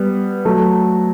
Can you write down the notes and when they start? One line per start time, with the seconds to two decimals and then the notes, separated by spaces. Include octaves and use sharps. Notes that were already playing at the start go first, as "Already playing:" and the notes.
Already playing: G3 B3
0.45 F#3 A3